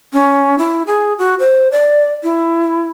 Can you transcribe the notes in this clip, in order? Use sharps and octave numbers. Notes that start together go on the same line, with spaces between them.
C#4
E4
G#4
F#4
C5
D5
E4